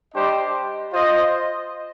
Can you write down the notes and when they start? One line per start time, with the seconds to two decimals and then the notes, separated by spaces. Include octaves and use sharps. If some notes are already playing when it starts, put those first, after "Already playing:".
0.14 G3 D4 G4 C5 D#5
0.93 F4 C5 D#5